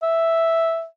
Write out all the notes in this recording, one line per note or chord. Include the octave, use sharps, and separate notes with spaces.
E5